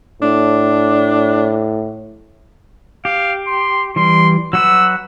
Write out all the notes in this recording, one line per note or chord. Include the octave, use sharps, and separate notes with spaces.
A2 D4
G4 F5
C6
E3 G3 C6
F#3 F#4 B4 E6